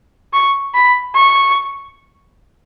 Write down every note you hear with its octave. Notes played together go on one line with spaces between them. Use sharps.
C#6
B5
C#6